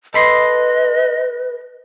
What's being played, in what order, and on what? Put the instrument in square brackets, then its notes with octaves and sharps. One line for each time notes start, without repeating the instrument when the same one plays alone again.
[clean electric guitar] A4 B5 C6 [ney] B4 [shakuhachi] D#5